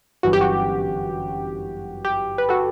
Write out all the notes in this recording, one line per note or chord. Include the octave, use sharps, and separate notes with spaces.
G1 F#2 E3 F#4
G4
F#4
G4
B4
F#4 A4